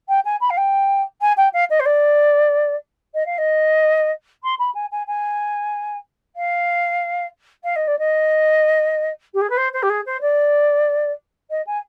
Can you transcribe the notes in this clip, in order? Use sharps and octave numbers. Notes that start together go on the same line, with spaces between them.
G5
G#5
B5
F5
G5
G#5
G5
F5
D#5
C5
D5
D#5
F5
D#5
C6
B5
G#5
G#5
G#5
F5
F5
D#5
D5
D#5
G4
G#4
B4
C5
C5
G4
G#4
C5
D5
D#5
G#5